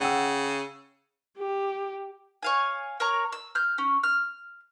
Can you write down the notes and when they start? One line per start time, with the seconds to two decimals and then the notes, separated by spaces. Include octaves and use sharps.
0.01 C#3 F#5 G5 E6
1.38 G4
2.43 C#5 F5 G#5
3.00 A#4 C#5 A#5
3.32 E6
3.55 F6 G6
3.78 C#4
4.03 F6